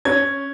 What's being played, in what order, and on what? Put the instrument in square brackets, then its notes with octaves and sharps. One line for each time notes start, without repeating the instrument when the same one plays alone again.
[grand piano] C#4 G#6